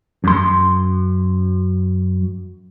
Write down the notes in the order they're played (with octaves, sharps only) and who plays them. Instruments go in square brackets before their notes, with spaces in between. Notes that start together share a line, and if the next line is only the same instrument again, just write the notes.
[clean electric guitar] F#2 C6